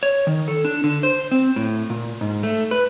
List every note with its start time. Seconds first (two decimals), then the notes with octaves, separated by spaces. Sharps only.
0.03 C#5
0.27 D#3
0.48 A4
0.65 D4
0.84 D3
1.03 C5
1.31 C4
1.56 A2
1.90 A#2
2.21 G#2
2.43 A3
2.71 B4